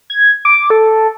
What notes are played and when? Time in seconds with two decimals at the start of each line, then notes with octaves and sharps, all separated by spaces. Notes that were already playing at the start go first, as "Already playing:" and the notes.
0.10 G#6
0.45 D6
0.70 A4